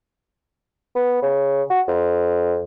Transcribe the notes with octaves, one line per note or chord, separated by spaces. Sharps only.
B3
C#3
F#4
F2